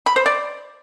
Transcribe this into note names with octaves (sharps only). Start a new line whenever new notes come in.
B5
C5
D5